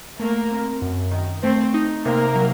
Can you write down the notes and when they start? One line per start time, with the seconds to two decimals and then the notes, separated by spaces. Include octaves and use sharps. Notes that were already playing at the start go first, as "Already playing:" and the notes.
0.19 A3 A#3 A#4
0.51 C4
0.82 F#2
1.12 D#3
1.43 A3 C4 C5
1.74 D#4
2.05 C3 A#3 A#4
2.36 F#3